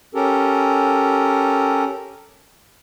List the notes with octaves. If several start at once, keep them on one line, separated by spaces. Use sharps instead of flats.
C#4 G4 A4 A#4